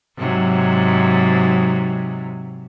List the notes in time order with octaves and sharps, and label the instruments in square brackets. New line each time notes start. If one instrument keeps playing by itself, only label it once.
[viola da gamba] G#2 C3 F#3